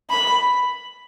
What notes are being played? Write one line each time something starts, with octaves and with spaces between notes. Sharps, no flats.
B5